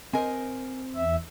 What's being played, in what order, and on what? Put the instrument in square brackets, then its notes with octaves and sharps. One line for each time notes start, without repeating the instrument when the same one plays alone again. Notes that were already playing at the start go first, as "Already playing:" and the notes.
[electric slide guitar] C4 C5 [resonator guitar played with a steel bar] A#4 D#5 G#5
[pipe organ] E2 E5